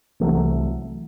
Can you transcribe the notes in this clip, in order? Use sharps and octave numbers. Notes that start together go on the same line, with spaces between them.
C2 C3 E3 F#3 A3